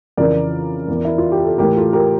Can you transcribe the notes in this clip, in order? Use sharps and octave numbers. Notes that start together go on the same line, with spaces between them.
F2 C#3 E3 A#4 D5
E2 E3
E4
F4
G4
A4
A2 E3 G4 A#4
F4 A4
G4 A#4